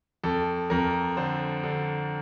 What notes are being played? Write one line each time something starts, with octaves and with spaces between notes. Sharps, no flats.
F2 A4
F2 A#4
D3 C5
D3